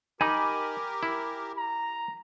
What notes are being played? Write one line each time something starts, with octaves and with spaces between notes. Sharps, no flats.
D#4 G4 A#4 G#5 B5 D6
E4
A#5